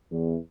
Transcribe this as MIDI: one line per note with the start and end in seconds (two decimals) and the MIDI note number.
0.11 0.36 40